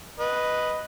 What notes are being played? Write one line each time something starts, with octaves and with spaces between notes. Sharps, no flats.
B4 D#5